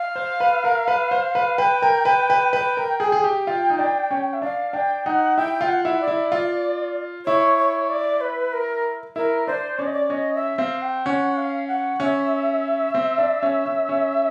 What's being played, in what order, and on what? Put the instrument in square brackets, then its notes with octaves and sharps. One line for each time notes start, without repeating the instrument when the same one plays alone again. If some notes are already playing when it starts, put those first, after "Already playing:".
Already playing: [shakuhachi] F5
[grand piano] C5
B4
A#4
B4
C5
B4
[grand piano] B4 [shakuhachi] G5
[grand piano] A#4
B4
B4
[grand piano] B4 [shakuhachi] G5
[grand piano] A#4
[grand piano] G#4 [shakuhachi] G5
[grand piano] G#4
G4
F4
D#4
D4
C#4
[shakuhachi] E5
[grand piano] D4 [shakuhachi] F5
[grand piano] D4 [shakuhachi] G5
[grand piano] D#4 [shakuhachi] F#5
[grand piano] E4 [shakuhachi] G5
[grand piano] F4
[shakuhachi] F#5
[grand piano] E4
[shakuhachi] D5
[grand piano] E4
F4
[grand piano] E4 [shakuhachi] C#5
[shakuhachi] C#5
D5
B4
A#4
[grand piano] E4 [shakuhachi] A#4
[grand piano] D4 [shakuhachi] C5
[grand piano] C#4 [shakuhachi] D5
[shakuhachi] D#5
D5
[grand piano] C#4 [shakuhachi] D#5
[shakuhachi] E5
[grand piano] C4 [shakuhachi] F5
[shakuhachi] G5
[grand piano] C#4 [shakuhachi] F#5
[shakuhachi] F5
F#5
[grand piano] C#4 [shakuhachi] E5
[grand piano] C4
D4
C#4
C#4
C#4